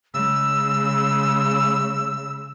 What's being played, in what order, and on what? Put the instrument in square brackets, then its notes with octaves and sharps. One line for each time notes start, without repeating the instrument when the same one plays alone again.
[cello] C#3 G#3 [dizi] E6